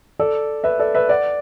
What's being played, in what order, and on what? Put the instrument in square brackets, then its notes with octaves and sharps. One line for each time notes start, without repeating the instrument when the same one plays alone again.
[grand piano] A4 D5
B4 E5
A4 D5
B4 E5
D5 F#5